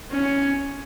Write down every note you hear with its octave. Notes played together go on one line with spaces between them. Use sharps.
C#4